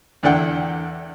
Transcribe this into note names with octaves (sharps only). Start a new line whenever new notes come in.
E2 D3 E4 D5 F#5 G5